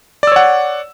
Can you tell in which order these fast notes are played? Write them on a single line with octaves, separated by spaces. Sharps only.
D5 E6 C#5 F#5